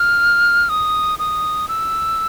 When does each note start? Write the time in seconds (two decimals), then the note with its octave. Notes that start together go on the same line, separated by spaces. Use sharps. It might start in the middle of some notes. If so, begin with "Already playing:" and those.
Already playing: F6
0.69 D#6
1.19 D#6
1.68 E6